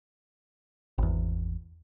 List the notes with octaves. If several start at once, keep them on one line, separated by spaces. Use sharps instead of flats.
G#1 E2